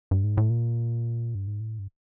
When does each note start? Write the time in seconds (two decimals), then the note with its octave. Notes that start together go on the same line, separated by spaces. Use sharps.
0.11 G2
0.24 G#2
0.37 A2
0.50 A#2
1.35 G2
1.47 G#2
1.60 A2
1.79 G2